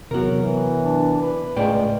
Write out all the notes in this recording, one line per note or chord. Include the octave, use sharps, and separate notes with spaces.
E2 C3 F#3 B3 F#4 A#4
E3
D4
B4
C#2 A2 A3 D5 G5